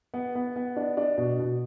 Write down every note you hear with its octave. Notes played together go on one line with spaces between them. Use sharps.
B3
B3
B3
D4
D4
B2
B2